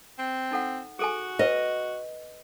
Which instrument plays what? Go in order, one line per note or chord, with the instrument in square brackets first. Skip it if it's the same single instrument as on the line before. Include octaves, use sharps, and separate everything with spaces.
[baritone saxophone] C4
[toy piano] D#4 A4 F#5
[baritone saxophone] F#4 [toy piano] G#4 A4 G#5
[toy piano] B4 [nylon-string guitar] D#5